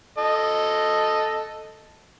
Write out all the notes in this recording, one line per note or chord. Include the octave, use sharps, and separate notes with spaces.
A4 D#5